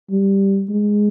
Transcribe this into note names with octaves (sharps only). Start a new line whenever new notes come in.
G3
G#3